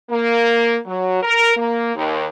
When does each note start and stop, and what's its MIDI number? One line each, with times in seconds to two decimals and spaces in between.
0.11 0.77 58
0.86 1.20 54
1.23 1.54 70
1.57 1.92 58
1.96 2.26 39